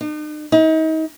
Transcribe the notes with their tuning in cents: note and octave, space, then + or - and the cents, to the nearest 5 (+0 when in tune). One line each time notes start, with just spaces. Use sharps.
D#4 -45
D#4 +35